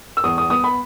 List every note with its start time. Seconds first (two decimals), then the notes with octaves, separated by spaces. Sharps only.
0.17 E6
0.24 E2 D#6
0.38 D#6
0.50 B3 D#6
0.64 B5